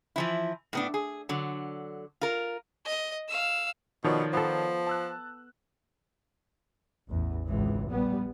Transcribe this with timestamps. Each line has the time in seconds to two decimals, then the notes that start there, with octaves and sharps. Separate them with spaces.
0.16 E3 F3 E4
0.73 A2 B3 D4
0.94 G#4
1.29 D3 F#3
2.21 F4 A#4
2.85 D#5
3.28 F5 E6
4.04 B2 D#3 F3 C#5 D5
4.33 F3 B3 A4
4.87 A5 E6 F#6
7.09 A1 E2
7.46 G#1 C#2 E3
7.88 A#1 G3 B3